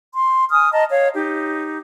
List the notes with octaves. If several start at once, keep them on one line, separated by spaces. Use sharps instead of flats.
C6
G#5 D#6 F6
D#5 A5 A#5
C#5 F5
D#4 G4